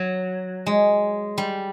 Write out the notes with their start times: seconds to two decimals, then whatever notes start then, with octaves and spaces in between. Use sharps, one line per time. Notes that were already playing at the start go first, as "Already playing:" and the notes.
Already playing: F#3
0.66 G#3
1.38 G3